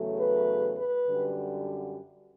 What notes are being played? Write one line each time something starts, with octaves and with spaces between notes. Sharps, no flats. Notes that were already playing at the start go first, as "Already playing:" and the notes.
Already playing: E2 C#3 F#3 A3
B4
B4
F#2 D3 G3